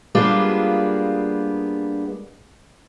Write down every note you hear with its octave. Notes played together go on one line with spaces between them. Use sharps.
G3 G#3 A#3 B3 D4 F4